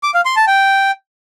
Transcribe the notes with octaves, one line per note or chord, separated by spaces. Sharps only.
D6
F5
C6
A5
G5